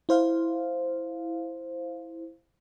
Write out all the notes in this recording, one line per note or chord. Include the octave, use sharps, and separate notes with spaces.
E4 C5 F5